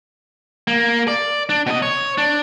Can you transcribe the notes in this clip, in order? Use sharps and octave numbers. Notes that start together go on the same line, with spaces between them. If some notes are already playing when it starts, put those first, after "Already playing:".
A#3
D5
D4
B2 D#5
C#5
D4